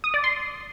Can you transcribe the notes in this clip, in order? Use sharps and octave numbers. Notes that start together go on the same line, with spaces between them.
D#6
D5
C6